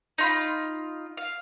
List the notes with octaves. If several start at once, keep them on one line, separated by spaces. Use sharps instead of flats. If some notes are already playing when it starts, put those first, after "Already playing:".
D#4 F4 B5
F5